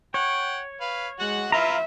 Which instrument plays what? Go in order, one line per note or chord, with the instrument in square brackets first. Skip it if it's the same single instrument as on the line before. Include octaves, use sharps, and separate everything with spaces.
[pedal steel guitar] C#5 [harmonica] F#5 G5
[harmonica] B4 F5
[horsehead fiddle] G#3 [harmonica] F#4 F#5
[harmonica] E4 F4 B4 [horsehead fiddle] E5 [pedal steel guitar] F5 A#5